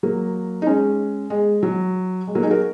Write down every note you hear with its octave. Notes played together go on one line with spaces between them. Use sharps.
F#3 A#3
D#4
G#3 C#4
G#3
F#3
G#3
F#3 A#3
D#4 G#4
F#4 A#4